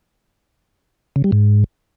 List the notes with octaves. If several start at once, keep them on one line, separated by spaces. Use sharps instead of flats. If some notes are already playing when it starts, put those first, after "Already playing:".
C#3
G3
G#2